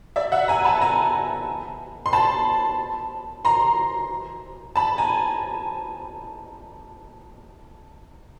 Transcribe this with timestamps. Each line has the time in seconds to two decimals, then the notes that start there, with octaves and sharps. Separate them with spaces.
0.16 D5 E5
0.32 E5 F#5
0.48 G#5 A#5
0.65 A5 B5
0.81 G#5 A#5
2.06 C6
2.13 A5 B5
3.45 A#5 C6
4.76 A5 B5
4.98 G#5 A#5